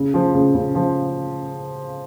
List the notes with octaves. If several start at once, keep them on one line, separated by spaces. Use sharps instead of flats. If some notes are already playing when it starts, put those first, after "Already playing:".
Already playing: C#3
F3
C#3
C#3
F3